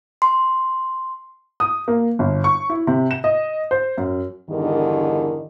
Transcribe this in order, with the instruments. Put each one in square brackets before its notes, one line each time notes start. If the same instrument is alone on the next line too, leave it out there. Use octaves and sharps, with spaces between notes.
[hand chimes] C6
[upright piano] D#6
A#3
G1
C#6
E4
C3
E7
D#5
C5
F#2
[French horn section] E2 G2 D3 D#3